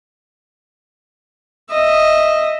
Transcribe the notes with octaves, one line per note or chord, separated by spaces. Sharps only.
D#5 E5